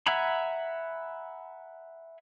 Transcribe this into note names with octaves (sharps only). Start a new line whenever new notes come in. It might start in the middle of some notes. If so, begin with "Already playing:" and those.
E5 F#5 G#5 A#5 B5